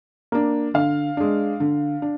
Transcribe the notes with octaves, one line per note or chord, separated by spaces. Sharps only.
A#3 D4
D3 F5
G#3 D4
D3
D4